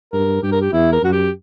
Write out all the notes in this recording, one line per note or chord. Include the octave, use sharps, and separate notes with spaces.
G2 A#4
G2 G4
A#4
G4
E2 E4
A#4
F#2 F#4
G4